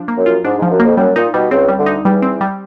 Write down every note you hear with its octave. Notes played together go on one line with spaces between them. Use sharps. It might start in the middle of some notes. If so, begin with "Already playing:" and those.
Already playing: F3 D4
A#3
F#2
F4
G#2 D4
G#2
F3
F#2
A#3
F2
F#2 G3
A#2 D#4
B2 G3
C#2 C#3 C4
G3
D2 D3
D#4
E2 E3 G3
C4
G3